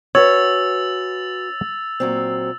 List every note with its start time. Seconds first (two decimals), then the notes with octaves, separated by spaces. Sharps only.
0.15 C#4 F#4 B4 C#5 E6 A6 F7
2.00 A#2 F#3 C4